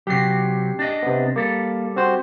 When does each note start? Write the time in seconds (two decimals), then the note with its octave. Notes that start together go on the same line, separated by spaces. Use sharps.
0.07 C3 F#3 G4 C7
0.79 D4 D#5
1.03 C3 B3
1.36 G3 A#3 A4
1.96 C4 F#4 C5